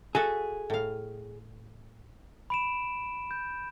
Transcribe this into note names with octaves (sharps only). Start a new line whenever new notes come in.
F#4 G#4 A4 E5
A2 F5
B5 D7 E7
G6